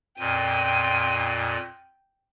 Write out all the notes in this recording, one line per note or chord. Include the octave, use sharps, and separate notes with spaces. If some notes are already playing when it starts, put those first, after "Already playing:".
F2 A#2 G5 D#7